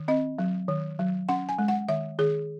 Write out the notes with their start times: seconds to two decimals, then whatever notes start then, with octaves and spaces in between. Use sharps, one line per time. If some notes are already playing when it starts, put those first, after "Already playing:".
Already playing: D#3
0.08 C4 D#5
0.39 F#3
0.68 D#3
0.99 F#3
1.29 C#4 F#5
1.49 G#5
1.59 G#3
1.68 F#5
1.88 D#3 E5
2.19 D#3 G#4